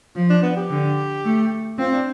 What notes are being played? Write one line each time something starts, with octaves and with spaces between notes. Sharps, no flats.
F3
D4
B3
G4
D3
A3
C4 F4
D4